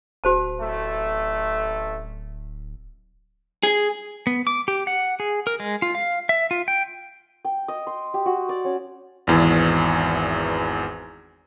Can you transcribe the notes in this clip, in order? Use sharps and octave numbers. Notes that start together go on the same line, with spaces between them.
D1 F#4 C5 A5
A1 A3
G#4
B3
D6
G4
F#5
G#4
A#4
G#3
F4
F5
E5
F4
G5
G5
D#5
C6
G4
F#4
D5
C#4
G#1 E2 E3